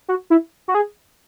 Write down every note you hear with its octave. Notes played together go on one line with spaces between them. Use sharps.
F#4
E4
F#4
G#4